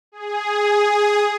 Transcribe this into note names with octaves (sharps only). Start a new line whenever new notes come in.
G#4